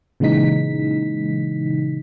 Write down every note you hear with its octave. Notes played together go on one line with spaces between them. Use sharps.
A#2 C#3 E3 G#3 D#4 B6